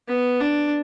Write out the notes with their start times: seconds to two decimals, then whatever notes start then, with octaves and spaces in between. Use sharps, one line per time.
0.08 B3
0.41 D4